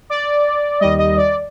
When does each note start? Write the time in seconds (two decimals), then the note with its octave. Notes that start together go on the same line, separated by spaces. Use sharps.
0.10 D5
0.80 D#2 D#3 G3 D#5
0.98 D#5
1.17 D5